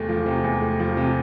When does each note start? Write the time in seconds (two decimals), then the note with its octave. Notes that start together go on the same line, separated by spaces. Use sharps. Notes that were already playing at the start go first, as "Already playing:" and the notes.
Already playing: E2 C3 A3
0.09 F3
0.26 C3
0.44 E2
0.61 A3
0.79 F3
0.97 C3